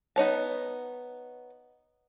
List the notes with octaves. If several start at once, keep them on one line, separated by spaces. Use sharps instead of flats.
B3 D#4 C#5 A5